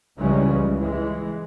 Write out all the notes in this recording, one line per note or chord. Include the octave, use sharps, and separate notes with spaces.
C#2 C#3 E3 G3 G#3 C#4
E3 G#3